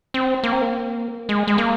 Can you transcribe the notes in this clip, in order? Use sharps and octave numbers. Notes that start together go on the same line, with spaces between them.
C4
A#3
C4
A#3
G#3
G#3
A#3